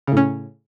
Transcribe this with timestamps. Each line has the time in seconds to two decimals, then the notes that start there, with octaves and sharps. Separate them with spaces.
0.07 C#3
0.12 A2
0.17 C#4